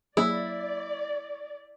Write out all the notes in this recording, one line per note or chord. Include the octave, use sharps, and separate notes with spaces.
F#3 A#3 E4 G#4 D5